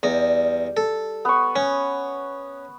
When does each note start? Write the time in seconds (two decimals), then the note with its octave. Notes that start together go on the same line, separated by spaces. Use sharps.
0.03 E2 G3 D#4
0.77 A4
1.25 B3 C#6
1.56 C#4